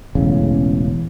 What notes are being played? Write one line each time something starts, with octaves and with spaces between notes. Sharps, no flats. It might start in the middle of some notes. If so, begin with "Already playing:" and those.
E1 A1 C#3